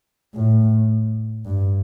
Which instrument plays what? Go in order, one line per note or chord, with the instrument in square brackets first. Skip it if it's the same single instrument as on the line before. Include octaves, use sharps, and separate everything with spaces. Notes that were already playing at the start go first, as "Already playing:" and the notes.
[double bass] A2
G2